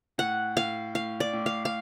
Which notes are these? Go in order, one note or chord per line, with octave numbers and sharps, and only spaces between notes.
A2 F#5
A2 F5
A2 F5
D5
A2
F5
F5